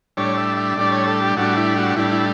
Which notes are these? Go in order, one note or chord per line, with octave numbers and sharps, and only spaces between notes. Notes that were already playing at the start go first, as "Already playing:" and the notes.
A2 G3 D4 C#5
E5
E5
A2 G3 D4 D5
C#5
A4
G4
A2 G3 D4 F#4
E4
F#4
A2 G3 D4 E4
E4